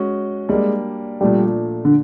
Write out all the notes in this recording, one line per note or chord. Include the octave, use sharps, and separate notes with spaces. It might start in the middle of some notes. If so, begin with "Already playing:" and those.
Already playing: G#3 C#4 F#4
G3 G#3 A#3 D4
A#2 F3 G3 A3 D4
D3